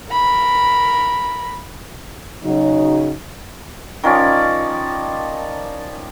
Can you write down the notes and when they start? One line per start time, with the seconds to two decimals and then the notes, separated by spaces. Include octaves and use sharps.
0.10 A#4 B5
2.44 C#3 F#3 D#4
4.04 D#3 F3 C#4 D5